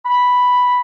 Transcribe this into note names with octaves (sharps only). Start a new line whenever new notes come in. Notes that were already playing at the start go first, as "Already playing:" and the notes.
B5